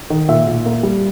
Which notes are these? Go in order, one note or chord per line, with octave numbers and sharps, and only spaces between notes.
D#3
A#2 E5
A#2
A#3
G3